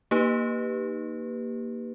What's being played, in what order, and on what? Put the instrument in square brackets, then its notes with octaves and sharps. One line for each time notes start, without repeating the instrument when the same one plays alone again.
[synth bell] A#3 D#4 G4 B4